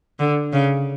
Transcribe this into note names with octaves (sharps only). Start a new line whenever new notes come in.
D3
C#3